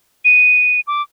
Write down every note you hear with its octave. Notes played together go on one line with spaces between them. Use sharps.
D#7
D6